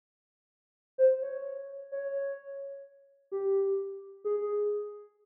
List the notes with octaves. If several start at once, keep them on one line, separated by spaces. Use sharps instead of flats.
C5
C#5
C#5
G4
G#4